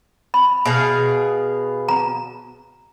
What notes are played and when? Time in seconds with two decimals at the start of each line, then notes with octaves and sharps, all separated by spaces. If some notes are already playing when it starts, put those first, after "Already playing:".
0.34 B5
0.65 B2 G#4 F5
1.88 A#5